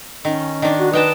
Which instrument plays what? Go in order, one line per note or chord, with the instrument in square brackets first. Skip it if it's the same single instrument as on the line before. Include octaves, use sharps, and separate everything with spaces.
[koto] D#3 [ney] C#4
[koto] D#3 D4
[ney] F#4
[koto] D#4 G5 A5 [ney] B4